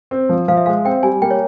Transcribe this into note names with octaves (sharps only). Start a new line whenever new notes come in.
C4
F3
F3 F5
E5
G#3 F5
C4 G5
G3 G#5
A#3 G5
C#5